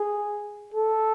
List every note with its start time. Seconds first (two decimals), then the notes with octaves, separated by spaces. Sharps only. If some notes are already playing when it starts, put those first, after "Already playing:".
Already playing: G#4
0.74 A4